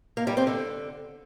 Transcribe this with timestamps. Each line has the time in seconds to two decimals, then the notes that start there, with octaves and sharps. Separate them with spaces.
0.17 A#3
0.27 G3
0.37 C4
0.47 D3